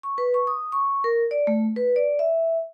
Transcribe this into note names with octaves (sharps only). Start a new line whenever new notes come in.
C#6
B4
C#6
D#6
C#6
A#4
D5
A3
B4
D5
E5